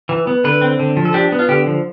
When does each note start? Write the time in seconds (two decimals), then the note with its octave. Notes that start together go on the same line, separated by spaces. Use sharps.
0.09 E3
0.27 B3
0.44 D3 B4
0.61 C4
0.80 D3
0.97 F3
1.05 A4
1.14 D4 G4
1.32 B3
1.39 F4
1.49 D3 G4
1.66 F3